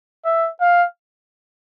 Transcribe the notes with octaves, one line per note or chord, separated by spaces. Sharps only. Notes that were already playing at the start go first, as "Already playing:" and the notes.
E5
F5